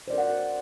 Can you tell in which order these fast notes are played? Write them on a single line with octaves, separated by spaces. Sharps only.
C5 D5 A#4 F#4 F#5